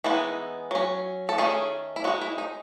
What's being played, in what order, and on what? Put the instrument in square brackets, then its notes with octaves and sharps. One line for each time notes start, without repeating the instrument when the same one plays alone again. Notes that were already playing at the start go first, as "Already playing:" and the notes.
[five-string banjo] E3 G#3 B3 D#4 E4
F#3 C#4
A4
D#3 A3 C#4 G#4
E4
G#3 F#4
D#4
E4
D#4